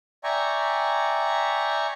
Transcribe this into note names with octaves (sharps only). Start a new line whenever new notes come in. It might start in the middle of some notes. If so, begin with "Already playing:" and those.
D5 E5 G5 G#5 A#5 C#6